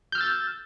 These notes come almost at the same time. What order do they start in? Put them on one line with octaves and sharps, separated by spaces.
G6 F6 E6 A6